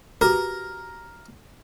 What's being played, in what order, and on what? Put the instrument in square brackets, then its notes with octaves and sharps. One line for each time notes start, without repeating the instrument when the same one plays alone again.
[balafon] F#4 G4 B4 [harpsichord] A#4